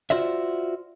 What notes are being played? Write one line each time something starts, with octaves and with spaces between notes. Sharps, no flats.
F4 F#4 C5 D5 E5